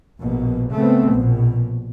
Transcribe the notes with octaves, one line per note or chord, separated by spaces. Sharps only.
A#1 B2 A#3
C#3 A3 B3 C4
A#1 B2